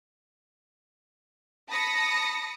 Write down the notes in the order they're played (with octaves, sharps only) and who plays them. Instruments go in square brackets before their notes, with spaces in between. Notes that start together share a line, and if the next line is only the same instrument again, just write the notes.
[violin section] A5 B5 D#6 A#6 C#7